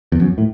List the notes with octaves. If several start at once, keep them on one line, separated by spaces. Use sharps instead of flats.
E2
F#2
A2